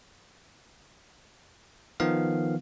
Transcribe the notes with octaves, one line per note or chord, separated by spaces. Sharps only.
D#3 F3 B3 F5